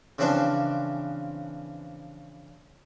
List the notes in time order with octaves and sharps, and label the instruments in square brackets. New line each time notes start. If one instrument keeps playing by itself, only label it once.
[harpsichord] C#3 E3 F3 C4 D4